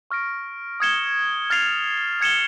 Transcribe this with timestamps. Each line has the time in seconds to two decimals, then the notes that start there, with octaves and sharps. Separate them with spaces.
0.11 C#6 F6 A#6 D7
0.80 D#6 G#6 C#7 E7 G7
1.50 F6 A6 C7 F7
2.21 D#6 G#6 C#7 E7 G7